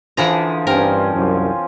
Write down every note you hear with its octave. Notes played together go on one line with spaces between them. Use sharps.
D3 E3 F3 D4 G#4 A#5
G2 C4 C#4 A#4
C2 F#2